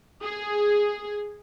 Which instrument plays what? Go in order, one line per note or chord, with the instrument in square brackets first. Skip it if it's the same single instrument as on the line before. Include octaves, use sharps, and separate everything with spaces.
[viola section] G#4